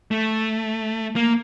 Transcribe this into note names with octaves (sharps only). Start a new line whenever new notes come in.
A3
A#3